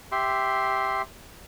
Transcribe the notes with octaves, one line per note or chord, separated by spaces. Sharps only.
G4 E5 C6